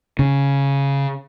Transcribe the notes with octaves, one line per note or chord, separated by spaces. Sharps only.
C#3